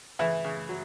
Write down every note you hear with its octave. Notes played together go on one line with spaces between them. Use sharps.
C#3 E3 E4
C#3
F#3